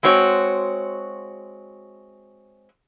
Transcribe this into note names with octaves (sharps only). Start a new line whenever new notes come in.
G#3 C4 F#4 C#5